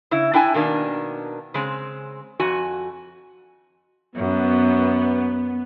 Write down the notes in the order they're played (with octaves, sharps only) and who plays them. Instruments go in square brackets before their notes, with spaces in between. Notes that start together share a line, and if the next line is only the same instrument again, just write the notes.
[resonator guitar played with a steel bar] C#3 E4
D4 E4 G5 G#5
B2 D#3 A#3 D4
C#3 G#3 C4
F2 F#4 G#5
[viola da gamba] F#2 [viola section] B3